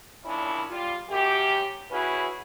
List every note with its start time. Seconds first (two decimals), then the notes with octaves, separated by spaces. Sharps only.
0.25 A#2 C#3 C#4 D4 E4
0.70 G3 F4
1.10 F#2 G4
1.91 C#4 E4 F#4 G#4 B4